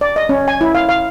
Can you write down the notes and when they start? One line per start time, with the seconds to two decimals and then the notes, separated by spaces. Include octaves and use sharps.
0.01 D5
0.16 D#5
0.29 C#4
0.48 G#5
0.61 E4
0.75 F5
0.89 F5